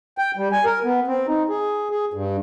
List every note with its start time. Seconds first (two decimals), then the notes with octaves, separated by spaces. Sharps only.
0.18 G5
0.37 G3
0.52 G#5
0.65 A#4
0.84 B3
1.07 C4
1.27 D#4
1.49 G#4
1.91 G#4
2.14 G2